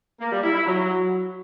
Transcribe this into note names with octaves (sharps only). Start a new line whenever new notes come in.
A#3
G3
E4
E4
F#3